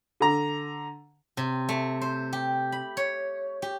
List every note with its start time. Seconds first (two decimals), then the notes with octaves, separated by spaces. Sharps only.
0.20 D3 A#5
1.37 C3
1.69 A3
2.02 C5
2.33 G4
2.72 B5
2.97 C#5
3.62 G4